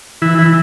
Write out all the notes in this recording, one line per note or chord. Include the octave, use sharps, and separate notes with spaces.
E3 E4
E3 E4